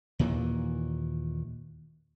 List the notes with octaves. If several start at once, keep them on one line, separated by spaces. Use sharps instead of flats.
D#2 A#2 D#3 E3